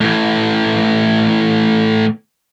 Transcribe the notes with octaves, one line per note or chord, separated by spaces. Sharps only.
A2 E3